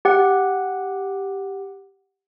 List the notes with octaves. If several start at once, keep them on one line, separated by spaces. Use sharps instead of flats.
G4 F#5